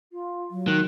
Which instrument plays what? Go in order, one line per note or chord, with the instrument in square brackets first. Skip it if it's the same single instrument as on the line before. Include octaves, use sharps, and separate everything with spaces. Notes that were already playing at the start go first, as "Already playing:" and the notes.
[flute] F4
[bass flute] F#3
[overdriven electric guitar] D#3 [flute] F#6